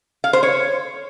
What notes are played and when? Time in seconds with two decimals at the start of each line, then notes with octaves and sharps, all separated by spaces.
0.24 F5
0.33 C5
0.43 C#5